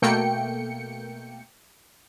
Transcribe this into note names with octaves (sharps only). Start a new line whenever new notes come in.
B2 A3 A#3 G5 C#7